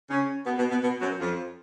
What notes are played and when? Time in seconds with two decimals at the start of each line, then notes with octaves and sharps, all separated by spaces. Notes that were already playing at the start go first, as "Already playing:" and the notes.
0.10 C#3 C#4
0.46 B2 B3
0.58 B2 B3
0.70 B2 B3
0.82 B2 B3
1.01 F#2 F#3
1.20 F2 F3